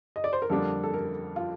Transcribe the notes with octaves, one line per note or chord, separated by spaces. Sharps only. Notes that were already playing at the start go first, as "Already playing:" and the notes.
D#5
D5
C5
A#4
F2 D3 G3 A#3 D4 A4
A4
A#4
F4